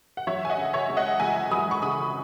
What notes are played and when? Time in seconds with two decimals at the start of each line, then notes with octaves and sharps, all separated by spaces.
0.17 F#5
0.27 F#3 C#5 E5
0.45 G#5
0.50 D#5 F#5
0.58 C#3
0.73 C#5 E5
0.90 C#2
0.97 D#5 F#5
1.20 C#2 E5 G#5
1.51 F#3 B5 D#6
1.71 C#6
1.82 C#3 B5 D#6